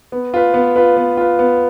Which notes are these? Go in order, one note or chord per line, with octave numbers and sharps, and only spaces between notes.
B3
F4 B4
B3
F4 B4
B3
F4 B4
B3